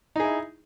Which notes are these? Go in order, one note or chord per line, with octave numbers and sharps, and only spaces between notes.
D#4 E4 G#4